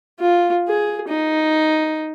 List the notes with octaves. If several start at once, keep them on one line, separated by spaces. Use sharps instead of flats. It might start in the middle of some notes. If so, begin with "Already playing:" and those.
F4
G#4
D#4